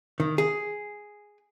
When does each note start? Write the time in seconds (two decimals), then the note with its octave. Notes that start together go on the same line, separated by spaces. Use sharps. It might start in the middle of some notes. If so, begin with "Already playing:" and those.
0.20 D#3
0.38 G#4